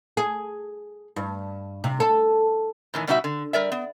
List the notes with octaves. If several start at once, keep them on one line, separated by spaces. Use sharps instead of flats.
G#4
G2
C3
A4
A2 D#3 E3
B2 G3 D4 D#4 F#4 E5
D3
G3 A#4 D5 E5
B3